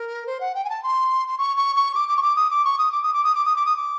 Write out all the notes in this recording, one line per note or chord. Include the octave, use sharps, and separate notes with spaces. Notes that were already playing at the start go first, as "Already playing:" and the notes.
Already playing: A#4
C5
F#5
G5
G#5
A5
C6
C6
C#6
C#6
C#6
D6
D6
C#6
D6
D#6
D6
C#6
D#6
D6
D#6
D6
D#6
D6
D#6
D6
D#6
D6